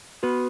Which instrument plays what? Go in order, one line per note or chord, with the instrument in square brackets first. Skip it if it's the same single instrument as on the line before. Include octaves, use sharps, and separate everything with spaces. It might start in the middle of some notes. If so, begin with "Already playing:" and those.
[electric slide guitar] B3 [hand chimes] F#4 B4